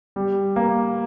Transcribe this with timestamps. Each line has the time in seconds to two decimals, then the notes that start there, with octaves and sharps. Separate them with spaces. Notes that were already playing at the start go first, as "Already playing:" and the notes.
0.16 G3
0.56 A#3